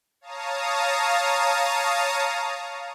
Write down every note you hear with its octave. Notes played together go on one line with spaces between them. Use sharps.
C#5 F5 A5 A#5 D#6